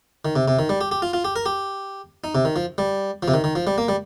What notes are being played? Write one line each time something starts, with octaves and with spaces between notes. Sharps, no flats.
D#3
C3
C3
D#3
G3
G4
G4
F4
F4
G4
A#4
G4
D#4
C3
D#3
F3
G3
F3
C3
D#3
D#3
F3
G3
A#3
G3